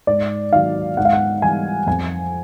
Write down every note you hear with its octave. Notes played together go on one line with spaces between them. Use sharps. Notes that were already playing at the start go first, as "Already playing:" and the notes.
G#2 D5
D#3 F#3 F5
G#2 F#5
F5
F#5
E3 G3 G#5
F2 G#5